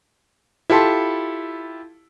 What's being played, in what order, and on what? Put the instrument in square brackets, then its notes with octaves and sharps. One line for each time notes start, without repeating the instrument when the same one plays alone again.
[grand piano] E4 F4 G4 A4 A5 C6